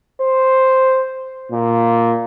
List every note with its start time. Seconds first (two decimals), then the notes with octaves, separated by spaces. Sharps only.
0.21 C5
1.52 A#2